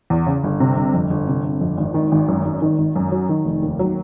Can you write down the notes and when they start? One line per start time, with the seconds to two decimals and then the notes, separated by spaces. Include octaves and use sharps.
0.10 E2
0.26 C#3
0.44 G1
0.60 C3
0.77 G1
0.94 F2
1.10 G1
1.28 C3
1.44 G1
1.61 F2
1.77 G#1
1.94 D#3
2.12 G#1
2.28 F#2
2.45 G#1
2.62 D#3
2.78 G#1
2.96 F#2
3.12 F#3
3.29 D#3
3.45 F1
3.62 D#2
3.79 F#3